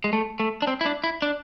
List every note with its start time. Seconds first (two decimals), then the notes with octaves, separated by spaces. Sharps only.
0.04 G#3
0.13 A3
0.40 A3
0.62 D4
0.67 C4
0.81 E4
0.86 D4
1.04 E4
1.22 D4